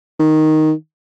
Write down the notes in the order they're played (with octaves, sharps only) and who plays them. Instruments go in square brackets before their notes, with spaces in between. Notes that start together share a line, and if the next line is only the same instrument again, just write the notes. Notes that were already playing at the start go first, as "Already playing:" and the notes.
[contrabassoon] D#3